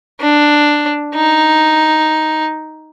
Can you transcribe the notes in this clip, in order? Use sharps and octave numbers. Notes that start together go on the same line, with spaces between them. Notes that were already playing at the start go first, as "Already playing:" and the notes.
D4
D#4